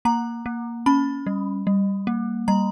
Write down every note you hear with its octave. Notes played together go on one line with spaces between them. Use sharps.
A#3 A#5
A#3
C#4 B5
G3
G3
A#3
G3 A#5